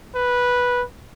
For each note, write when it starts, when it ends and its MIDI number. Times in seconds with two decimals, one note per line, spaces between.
0.15 0.83 71